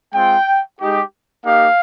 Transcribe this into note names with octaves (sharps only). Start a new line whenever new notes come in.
G#3 C4 F4 G5
G#3 D#4 G4
A#3 D#4 G4 F5